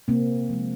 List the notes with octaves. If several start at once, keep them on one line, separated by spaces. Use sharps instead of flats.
C3 A#3 C4
F3 G#3